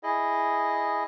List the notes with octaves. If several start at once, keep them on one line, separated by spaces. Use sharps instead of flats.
E4 G#4 D#5